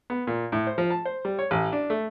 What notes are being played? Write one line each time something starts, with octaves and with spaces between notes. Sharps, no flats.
B3
A#2
A2
C5
F3
A5
C5
G3
C#5
A1
D4
A3